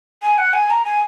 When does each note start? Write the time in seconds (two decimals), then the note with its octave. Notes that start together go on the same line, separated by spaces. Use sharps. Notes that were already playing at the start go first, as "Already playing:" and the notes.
0.22 G#5
0.38 F#5
0.53 G#5
0.70 A#5
0.85 G#5